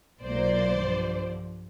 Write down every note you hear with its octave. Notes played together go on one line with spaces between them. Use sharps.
B1 A#2 F#3 A#3 C5 D5
G2 D3 F3